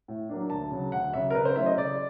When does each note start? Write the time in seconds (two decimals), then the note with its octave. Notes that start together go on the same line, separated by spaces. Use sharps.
0.08 A2
0.29 F#3 A#3 D4
0.50 D2 A5
0.71 C#3 F#3
0.92 D2 F#5
1.13 C#3 F#3 E5
1.30 A#4
1.34 C#3 B4
1.45 C5
1.56 F#3 A3 C#4 E4 E5
1.66 D#5
1.77 C#3 D5